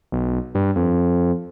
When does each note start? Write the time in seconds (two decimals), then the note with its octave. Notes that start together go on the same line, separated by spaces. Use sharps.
0.12 B1
0.55 G2
0.76 F2